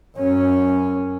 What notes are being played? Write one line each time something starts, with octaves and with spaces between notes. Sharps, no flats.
F#2 C#4